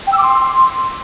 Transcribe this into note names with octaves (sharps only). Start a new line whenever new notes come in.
G5
E6
D6
C6